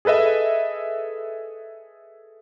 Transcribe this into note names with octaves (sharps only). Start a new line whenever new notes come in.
G#4 A4 B4 D#5 E5